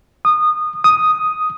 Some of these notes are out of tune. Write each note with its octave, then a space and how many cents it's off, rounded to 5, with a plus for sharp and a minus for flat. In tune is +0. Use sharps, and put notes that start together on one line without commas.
D#6 -20
D#6 +5